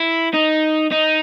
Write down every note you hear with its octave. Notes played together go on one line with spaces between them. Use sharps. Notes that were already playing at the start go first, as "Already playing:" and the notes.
Already playing: E4
D#4
D#4